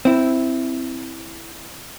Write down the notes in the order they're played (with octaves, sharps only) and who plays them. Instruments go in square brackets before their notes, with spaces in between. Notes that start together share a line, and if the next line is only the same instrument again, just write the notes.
[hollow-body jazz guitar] C4 E4